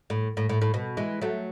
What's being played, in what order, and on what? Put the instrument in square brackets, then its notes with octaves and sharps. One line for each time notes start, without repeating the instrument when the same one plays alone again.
[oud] A2
A2
A2
A2
B2
E3 G#3
F#3 A3